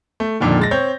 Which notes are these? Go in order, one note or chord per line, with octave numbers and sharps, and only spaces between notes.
A3
F2 A#2 D3 D#3
G#3 A6 A#6
C4 C#5 G6